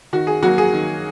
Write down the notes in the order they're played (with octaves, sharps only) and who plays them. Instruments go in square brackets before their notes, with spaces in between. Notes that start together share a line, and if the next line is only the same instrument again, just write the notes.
[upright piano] D#3 F#4
G#4
F#3 A#3 F#4
G#4
D#3